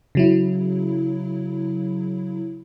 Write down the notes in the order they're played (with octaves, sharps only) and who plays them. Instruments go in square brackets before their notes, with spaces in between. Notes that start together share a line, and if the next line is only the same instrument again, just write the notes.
[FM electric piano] C#3 F#3 E4